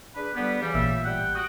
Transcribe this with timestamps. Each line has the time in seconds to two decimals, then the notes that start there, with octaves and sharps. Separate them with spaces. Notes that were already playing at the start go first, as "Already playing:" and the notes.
0.15 D4 G#4 B4
0.34 D3 G3 B3 G4
0.61 C#3 E3 G3 G4
0.74 A1 A#2 E5
1.04 G3 F#5 G5
1.35 F#4 D#6 F#6 D7